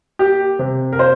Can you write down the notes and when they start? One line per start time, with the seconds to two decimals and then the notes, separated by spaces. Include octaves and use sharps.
0.19 A#3 G4
0.59 C3
0.93 A#4
0.99 A#3 C5